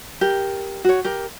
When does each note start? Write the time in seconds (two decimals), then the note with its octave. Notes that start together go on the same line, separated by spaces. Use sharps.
0.21 G4 A#4
0.84 F#4 C#5
1.05 G4 A#4